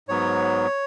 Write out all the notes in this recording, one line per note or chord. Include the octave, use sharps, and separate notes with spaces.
G#2 F#3 B3 C#5